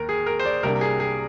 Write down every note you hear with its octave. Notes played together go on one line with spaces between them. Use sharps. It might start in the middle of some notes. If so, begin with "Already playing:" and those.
Already playing: D#2 A#4
G#4
A#4
C5
D5
C2 C3 G3 A#3 D4 A#4
G#4
G#4